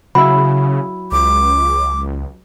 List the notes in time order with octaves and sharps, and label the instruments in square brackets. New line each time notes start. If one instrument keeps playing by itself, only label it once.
[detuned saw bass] C#3 [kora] F#3 E4 [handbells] B5
[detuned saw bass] C#2 [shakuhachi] D6